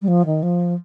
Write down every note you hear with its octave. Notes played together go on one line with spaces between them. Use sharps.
G3
F3
D#3
F3